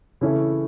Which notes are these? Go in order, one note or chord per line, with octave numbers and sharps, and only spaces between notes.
C#3 E3 A3 C#4 E4